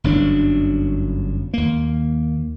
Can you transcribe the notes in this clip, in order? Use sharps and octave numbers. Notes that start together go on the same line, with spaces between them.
G1 F#2 F#3 D4
D#2 A#3